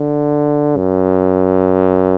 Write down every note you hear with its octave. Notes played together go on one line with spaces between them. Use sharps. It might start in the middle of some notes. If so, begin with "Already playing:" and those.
Already playing: D3
F#2